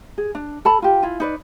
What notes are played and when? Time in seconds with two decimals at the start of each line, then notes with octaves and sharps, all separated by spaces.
0.18 G#4
0.35 D4
0.65 A4 A5 B5
0.82 F4 G4
1.02 E4 F4 G#5
1.20 D#4 B4 D5